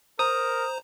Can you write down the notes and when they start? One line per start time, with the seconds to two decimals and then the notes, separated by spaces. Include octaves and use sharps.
0.19 A#4 C5 A#5 D#6